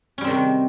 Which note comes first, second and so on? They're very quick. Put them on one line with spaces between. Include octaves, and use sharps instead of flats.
C#4 G3 C4 D#3 C3